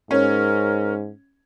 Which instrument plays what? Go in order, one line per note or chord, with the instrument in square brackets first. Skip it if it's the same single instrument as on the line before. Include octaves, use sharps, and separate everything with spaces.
[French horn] G#2 [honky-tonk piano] C#4 [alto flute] A#4